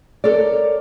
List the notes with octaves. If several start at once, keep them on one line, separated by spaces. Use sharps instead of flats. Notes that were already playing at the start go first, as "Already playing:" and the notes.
A4 A#4 C#5 D5